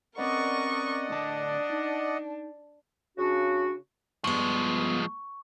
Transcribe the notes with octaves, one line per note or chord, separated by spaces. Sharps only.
C4 C#4 A#4 B4 D5 D#5 F#5 C#6
A2 D3 D4 A5
D#4
C#3 D4 F#4
G2 F3 G#3 B3 C#6